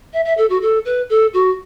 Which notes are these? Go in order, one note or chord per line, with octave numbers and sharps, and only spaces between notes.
E5
E5
A4
F#4
A4
B4
A4
F#4